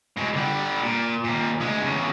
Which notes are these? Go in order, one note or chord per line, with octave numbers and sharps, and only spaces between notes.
B2 G#3
D3 G3
A#2
D#2 A#2
D2 G#3
E2 C#3